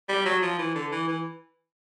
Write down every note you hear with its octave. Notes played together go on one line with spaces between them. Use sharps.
G3
F#3
F3
E3
D3
E3
E3